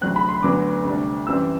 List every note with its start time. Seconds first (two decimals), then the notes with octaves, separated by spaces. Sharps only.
0.01 D2 C3 F#3 C4 F#6
0.16 B5
0.29 C6
0.43 D2 D3 F#3 B3 D6
0.85 D2 C3 G3 D4
1.27 F#2 E3 G3 C4 E6